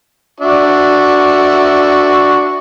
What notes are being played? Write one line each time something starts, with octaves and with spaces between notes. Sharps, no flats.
D4 F#4 E5